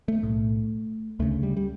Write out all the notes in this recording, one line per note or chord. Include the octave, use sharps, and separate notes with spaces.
A3
B1 A2
D2 C#3 A3
G3
G3